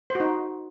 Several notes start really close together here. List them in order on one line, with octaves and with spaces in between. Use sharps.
C5 F#4 D#4